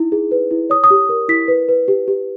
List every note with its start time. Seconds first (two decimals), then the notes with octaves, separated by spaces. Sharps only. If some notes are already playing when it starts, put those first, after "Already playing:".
Already playing: D#4 E4
0.12 G#4
0.31 B4
0.51 E4
0.70 C#5 D#6
0.84 D#6
0.90 G4
1.09 A#4
1.29 E4 B6
1.48 B4
1.69 B4
1.88 G4
2.08 G4